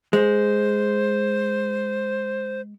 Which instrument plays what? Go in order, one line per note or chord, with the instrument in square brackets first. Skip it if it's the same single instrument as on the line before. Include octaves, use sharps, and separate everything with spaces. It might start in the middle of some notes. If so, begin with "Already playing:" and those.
[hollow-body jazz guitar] G#3 [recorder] C5